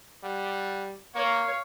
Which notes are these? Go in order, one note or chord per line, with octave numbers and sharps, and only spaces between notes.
G3 F#5
A#3 C#5 F5